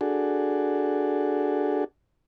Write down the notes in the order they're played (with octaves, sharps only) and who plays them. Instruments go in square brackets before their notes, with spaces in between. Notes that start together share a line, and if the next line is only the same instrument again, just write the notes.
[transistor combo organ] D4 F#4 G#4 A4